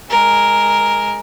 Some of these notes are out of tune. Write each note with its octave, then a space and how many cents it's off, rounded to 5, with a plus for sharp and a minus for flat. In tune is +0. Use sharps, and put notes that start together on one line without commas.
G#3 +0 A#4 +0